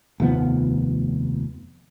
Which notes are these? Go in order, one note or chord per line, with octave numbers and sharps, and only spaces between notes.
F1 D#2 F3 B3